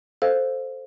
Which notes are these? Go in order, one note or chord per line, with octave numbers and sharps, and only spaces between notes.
A4 C5 F5